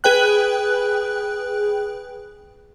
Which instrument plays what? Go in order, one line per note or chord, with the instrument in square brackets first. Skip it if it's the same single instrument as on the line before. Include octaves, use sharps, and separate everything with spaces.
[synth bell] G#4 B4 G5 F#6